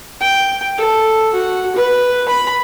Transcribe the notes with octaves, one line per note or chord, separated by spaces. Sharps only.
G5
A4
F#4
B4
B5